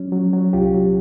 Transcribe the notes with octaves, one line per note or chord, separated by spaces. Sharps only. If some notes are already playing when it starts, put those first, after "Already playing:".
Already playing: F#3 C#4
F#3
F#3
C2 F4 G4
F#3